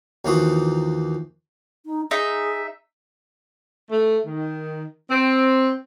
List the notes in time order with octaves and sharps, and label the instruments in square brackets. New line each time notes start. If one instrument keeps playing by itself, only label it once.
[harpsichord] D#2 E3 F3 A#3 F#4 D#6
[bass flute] D#4
[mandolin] D#4 E5 [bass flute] G#4
[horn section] A3
D#3
C4